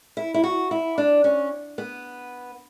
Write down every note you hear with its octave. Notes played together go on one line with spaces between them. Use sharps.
E4
E4
F#4
E4
D4
C#4
B3